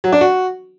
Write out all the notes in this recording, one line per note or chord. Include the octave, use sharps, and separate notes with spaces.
F#3
D4
F#4